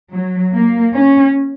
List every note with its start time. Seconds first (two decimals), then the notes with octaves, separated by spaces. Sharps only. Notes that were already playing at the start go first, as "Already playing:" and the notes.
0.13 F#3
0.53 A#3
0.94 C#4